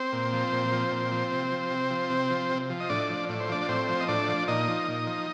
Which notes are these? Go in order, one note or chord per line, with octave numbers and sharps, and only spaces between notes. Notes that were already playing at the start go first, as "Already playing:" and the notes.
Already playing: C4 C5
A#2
F3
A#2
F3
A#2
F3
C3
F3
C3
F3
C3
F3
C3
F3
D#5
A2 D4 D5
F3
A2 D5
C5
F3 D4 D5
D5
A2 C4 C5
F3
D#5
A2 D4 D5
F3
A#2 D#4 D#5
F3
A#2
F3